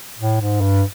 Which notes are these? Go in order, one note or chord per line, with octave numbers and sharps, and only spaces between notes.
A2
G#2
G2